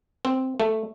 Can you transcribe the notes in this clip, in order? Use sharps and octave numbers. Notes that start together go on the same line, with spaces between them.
C4
A3